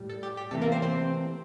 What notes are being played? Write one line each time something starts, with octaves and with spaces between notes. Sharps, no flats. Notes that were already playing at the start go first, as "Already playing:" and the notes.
Already playing: A2 G3
A4
G4
G4
C3 E3 A3 A4
A#3 A#4
C4 C5
C4 C5